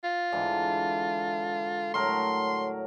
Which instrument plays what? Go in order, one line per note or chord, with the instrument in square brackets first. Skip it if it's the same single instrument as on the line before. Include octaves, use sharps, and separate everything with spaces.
[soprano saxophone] F4
[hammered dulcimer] G#2 D3 E3
[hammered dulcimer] A2 F#3 A#4 [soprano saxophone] C6